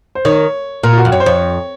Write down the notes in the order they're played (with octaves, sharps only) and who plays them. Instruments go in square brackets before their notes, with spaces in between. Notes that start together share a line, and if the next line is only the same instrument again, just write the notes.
[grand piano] C5
[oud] D#3 [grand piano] C#5
[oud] A#2 [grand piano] A#4
[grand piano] F4
F#4
[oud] F2
[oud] F#2 [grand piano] C#5
[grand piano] C5
[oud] F2 [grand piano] C#5